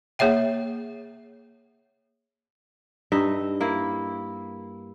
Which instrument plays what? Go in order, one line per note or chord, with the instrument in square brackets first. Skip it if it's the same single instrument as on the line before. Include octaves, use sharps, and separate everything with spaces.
[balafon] A#3 G#4 C#5 E5 G5
[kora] G2 D#4 E5
A#3 E4